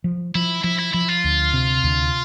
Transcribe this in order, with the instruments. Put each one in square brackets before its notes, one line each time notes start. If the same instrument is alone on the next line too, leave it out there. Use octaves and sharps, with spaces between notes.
[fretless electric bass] F3
[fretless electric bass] F3 [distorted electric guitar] E4
[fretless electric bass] F3 [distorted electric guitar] E4
[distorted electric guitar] E4
[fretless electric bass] F3 [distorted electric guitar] E4
[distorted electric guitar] F4
[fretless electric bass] D2
C3
D2